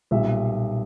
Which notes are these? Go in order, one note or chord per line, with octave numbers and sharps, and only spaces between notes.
B1 A#2 G3 E5